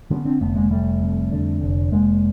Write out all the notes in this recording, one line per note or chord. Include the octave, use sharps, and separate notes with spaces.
D3 B3 C#4
C4 D4
F1 A3 B3
G#3 A#3
F1 G3 A3
F2
D3
F1
F1 G#3 A#3